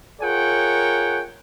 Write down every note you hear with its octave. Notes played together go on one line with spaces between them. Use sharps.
F4 G#4 A#4 C#5 F#5 G5